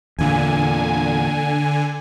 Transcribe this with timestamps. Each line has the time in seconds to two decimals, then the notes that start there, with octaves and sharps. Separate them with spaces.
0.19 E2 A#2 D3 G#5